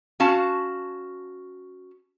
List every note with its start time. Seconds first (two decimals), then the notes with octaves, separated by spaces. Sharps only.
0.20 C#4 F#4 F5 A5